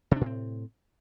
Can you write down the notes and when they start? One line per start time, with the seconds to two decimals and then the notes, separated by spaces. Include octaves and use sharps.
0.11 C3
0.16 D4
0.21 A2
0.26 C4